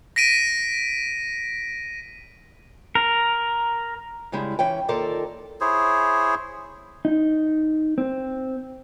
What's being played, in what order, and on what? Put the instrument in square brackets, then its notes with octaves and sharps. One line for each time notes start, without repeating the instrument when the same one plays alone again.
[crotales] A#6 B6 D7 D#7
[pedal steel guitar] A#4
[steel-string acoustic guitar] C#3 G3 G#3 E4
E3 C#4 G5
D#2 F4 A4 A#4 D5
[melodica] E4 G#4 C5 C#5
[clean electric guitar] D#4
C4